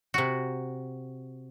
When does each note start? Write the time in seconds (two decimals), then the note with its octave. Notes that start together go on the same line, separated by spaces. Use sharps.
0.14 C3 F#4